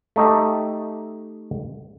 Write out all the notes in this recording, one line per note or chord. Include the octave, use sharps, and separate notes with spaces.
A3 D#4 G4